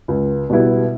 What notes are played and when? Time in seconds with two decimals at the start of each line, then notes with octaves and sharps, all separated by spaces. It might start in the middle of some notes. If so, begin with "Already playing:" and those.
0.08 C#2
0.50 B2 G3 B3 E4